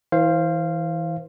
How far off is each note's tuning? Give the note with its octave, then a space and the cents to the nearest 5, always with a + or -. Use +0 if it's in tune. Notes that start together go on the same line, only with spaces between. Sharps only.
E3 -20 C5 +20 F5 -15